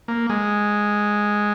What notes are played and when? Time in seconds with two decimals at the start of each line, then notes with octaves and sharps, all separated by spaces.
0.08 A#3
0.30 G#3